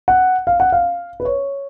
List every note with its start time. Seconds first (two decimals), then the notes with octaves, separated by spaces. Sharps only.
0.08 F#5
0.47 F5
0.60 F#5
0.72 F5
1.20 B4
1.25 C#5